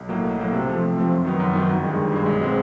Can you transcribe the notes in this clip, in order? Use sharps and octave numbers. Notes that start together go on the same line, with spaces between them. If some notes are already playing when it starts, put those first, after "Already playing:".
Already playing: B1
A2 F#3 A#3
B1
A2 F#3 A#3
C3
F3 A3 C4
C3
F3 A3 C4
F#2
D#3 F#3 B3
F#2
D#3 F#3 B3
G1
G2 D#3 G#3
G1
G2 D#3 G#3
B1
B2 G#3 C4